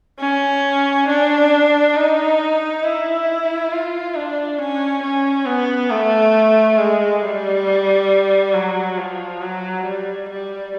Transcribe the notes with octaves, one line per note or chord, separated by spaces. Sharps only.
C#4
D4
D#4
E4
F4
D4
C#4
C#4
B3
A3
G#3
G3
F#3
F3
F#3
G3
G3